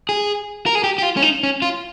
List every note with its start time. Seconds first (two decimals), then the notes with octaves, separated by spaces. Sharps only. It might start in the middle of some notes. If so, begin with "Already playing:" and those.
0.09 G#4
0.66 A#4
0.75 G#4
0.84 G4
0.98 G4
1.02 F4
1.17 C#4
1.22 D#4
1.43 C#4
1.62 F4